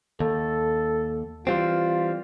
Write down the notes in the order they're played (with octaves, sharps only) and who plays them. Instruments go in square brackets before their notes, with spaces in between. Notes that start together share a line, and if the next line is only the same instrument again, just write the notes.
[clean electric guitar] D#2 [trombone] A4
[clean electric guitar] E3 G3 C4 [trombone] F4